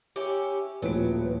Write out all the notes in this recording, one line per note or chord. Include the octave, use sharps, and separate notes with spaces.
C#4 E4 G4
D#1 A2 F3 F#3 B4 D7